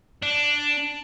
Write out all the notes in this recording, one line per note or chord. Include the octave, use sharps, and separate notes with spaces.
D4